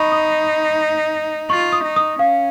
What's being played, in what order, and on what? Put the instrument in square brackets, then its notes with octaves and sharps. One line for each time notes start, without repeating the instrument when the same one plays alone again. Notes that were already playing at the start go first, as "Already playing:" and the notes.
Already playing: [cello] D#4 [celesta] B5 C#6
[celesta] D#6
[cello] F4 [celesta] C#6
[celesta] D#6
[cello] D#4
[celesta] D#6
[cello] C#4 [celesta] F5